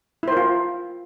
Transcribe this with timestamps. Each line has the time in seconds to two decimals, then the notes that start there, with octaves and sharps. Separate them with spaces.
0.23 E4
0.28 C5
0.32 A#4
0.37 F4